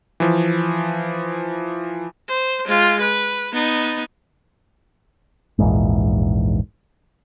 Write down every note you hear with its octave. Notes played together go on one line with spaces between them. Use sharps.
E3 F3
C5
G#3 F4
B4
B3 D#4
A#1 E2 G#2